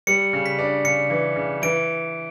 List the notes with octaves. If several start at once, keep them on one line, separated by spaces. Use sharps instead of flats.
G3 C#7
C#3
B6
D4
C#3 C#7
E3
C#3
E3 D7